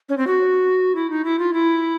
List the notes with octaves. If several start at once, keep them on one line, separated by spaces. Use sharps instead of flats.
C#4
C4
F#4
E4
D#4
E4
F4
E4